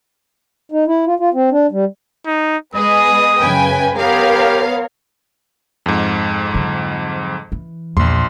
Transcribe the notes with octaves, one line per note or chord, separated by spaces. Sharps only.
D#4
E4
F4
F4
C4
D4
G3
D#4
G#3 B3 G#4 B4 D#5 D#6
F#2 C#3 B4 G5 G#5
B3 G4 A#4 C#5 F5
F2 G#2
D3 F#3
E3
A#1 E2 A#2 C6